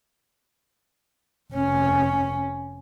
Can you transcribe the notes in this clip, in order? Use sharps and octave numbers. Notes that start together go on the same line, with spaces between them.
F1 C#4